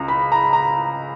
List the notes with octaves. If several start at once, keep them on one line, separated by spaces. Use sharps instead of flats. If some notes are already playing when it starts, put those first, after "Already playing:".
Already playing: C#2 A#5
B5
A#5
A#5